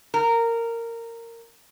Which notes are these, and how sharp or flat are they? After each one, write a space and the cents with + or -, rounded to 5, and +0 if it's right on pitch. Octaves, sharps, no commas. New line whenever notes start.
A#4 -15